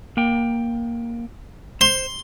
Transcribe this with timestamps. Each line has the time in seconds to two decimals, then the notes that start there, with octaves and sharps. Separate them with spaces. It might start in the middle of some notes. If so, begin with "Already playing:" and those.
0.17 A#3 G5
1.81 C5 C6